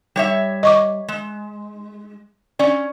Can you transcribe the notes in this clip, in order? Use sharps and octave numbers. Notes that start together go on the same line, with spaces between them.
G3 C#5 E5
D#5 C#6 D6
G#3
C#4 D5